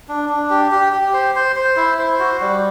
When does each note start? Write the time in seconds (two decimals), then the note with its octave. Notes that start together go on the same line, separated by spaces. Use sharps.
0.09 D4
0.29 D4
0.50 G4
0.71 G4
0.93 G4
1.14 C5
1.35 C5
1.56 C5
1.76 E4
1.99 C5
2.19 F#4
2.41 G3